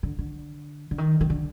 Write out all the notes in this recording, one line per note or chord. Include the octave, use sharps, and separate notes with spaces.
D3
D3
D3
D#3
D#3
D3